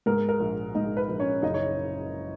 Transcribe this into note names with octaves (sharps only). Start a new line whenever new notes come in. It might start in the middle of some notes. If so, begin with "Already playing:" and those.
G#2 A#4
A#4
A#1
G#2 D#4 D#5
B4
A#1
C#4 C#5
F#1 D#4 D#5
C#5